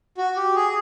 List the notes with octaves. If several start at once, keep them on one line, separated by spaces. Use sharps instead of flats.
F#4
G4
G#4